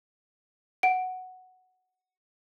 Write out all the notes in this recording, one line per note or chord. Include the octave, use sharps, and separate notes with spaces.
F#5 D7